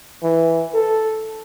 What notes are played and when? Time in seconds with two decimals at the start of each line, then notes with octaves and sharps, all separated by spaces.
0.23 E3
0.74 A4